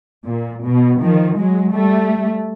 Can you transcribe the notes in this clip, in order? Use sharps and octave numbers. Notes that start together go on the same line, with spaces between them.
A#2
B2
D#3 F3
F#3 G#3
G3 A3